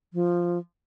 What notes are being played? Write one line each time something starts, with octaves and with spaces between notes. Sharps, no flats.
F3